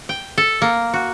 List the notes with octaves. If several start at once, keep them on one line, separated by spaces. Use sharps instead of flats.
G5
A4
A#3
F#4